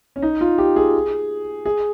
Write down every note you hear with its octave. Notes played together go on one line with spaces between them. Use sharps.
C#4
D#4
F4
G4
G#4
G#4